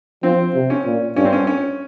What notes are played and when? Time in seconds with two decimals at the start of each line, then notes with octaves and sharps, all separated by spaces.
0.23 F3 C4
0.54 C3
0.70 C#4
0.86 A#2
1.16 G2 C#4
1.25 C4
1.33 C#4
1.47 C#4